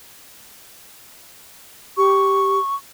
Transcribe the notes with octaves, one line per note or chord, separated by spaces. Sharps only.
G4 C#6